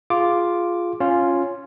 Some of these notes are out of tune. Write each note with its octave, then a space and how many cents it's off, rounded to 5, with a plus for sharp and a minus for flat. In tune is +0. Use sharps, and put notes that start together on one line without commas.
F4 +0 G#4 +0 D6 +0
C#4 +0 F4 +0